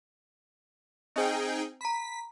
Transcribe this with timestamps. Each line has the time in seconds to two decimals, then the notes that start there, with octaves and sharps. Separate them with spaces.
1.16 C4 D#4 G#4 C5 G5
1.81 A#5 B5 B6